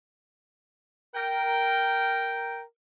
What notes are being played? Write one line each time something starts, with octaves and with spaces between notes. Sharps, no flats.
A#4 G5